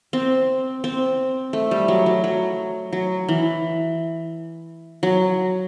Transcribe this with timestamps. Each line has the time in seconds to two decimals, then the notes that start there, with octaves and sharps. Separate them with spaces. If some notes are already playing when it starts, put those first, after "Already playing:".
0.13 C4
0.84 C4
1.53 A3
1.71 G3
1.88 F#3
2.06 F#3
2.24 F#3
2.93 F#3
3.29 E3
5.03 F#3